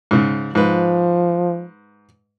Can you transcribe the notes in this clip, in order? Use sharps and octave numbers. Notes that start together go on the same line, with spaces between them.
G#2 C#3
G#2 F3 B4